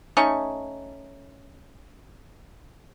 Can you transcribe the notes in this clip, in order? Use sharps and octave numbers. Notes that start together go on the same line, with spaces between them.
A3 C#4 D#4 C#6